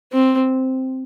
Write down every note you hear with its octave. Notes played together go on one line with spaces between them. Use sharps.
C4